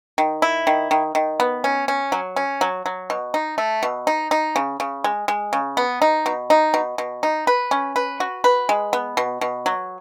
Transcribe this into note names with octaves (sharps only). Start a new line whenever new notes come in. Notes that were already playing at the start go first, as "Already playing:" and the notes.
D#3
E4
D#3
D#3
D#3
B3
C#4
C#4
F#3
C#4
F#3
F#3
B2
D#4
A3
B2
D#4
D#4
C#3
C#3
G#3
G#3
C#3
B3
D#4
B2
D#4
B2
B2
D#4
B4
C#4
B4
F#4
B4
G#3
B3
B2
B2
F#3